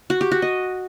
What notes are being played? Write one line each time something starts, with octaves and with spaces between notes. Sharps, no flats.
F#4
G4
F#4
D#5